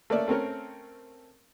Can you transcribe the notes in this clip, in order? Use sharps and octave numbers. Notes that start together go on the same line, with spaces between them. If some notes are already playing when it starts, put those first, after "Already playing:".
A3 A#3 C#4 D5 E5
A3 C4 C#4 A#4